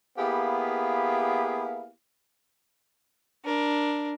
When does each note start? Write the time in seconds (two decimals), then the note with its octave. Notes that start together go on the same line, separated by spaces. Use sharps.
0.18 A#3 B3 E4 G4 G#4 F5
3.45 D4 A#4